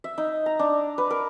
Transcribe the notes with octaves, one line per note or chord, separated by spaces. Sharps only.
E5
D#4
A#5
D4
B4
A#4